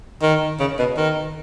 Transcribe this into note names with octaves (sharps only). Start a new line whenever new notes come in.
D#3
C#3
B2
D#3